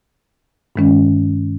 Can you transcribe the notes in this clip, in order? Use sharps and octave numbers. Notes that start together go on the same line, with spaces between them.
G2 D#3 G#3 C#4